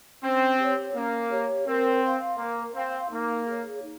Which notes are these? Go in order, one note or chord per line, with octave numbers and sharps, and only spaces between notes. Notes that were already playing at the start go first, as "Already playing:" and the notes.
C4 C#4
G4 C#5
A#3 C#4
G4 C#5
C4 A#4
F5 C6
A#3 A#4
C4 F5 C6
A#3 D#4
G#4 C#5
D#4